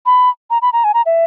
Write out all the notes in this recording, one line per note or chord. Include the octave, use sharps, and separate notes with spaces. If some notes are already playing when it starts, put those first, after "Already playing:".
B5
A#5
B5
A#5
G#5
A#5
E5